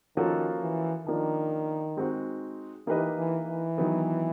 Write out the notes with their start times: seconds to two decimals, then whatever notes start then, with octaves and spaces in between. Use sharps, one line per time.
0.17 D#3 F3 A#3 C#4 F#4 A4
0.62 E3
1.06 D#3 F3 A#3 D4
1.97 G#3 C4 D#4 F#4
2.87 E3 A#3 D#4 G4 B4 D#5
3.17 E3
3.48 E3
3.78 D#3 F#3 B3